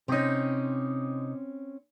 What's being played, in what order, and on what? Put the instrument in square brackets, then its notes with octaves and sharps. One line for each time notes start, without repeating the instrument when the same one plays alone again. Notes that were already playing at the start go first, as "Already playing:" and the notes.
[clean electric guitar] C3 D#4 [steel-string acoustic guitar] C4 C#4